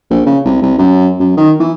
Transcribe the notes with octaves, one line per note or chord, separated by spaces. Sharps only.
A#1
C#3
C2
C2
F#2
F#2
D#3
E3